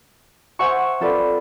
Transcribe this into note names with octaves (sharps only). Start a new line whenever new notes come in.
C5 E5 F#5 G#5 C#6
C4 F4 A4 B4 D5